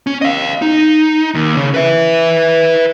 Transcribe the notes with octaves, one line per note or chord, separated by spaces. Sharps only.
C#4
D#5 F5
D#4
D#2
C#3
B4 E5